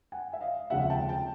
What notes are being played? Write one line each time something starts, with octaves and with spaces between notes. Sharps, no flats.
F#5 G#5
E5
D#5 F5
F1 D#2 C#3 F3 G#3 E5 F#5
G5 A5
G5 A5